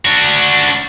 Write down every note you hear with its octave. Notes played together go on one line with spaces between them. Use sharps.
D4 F#4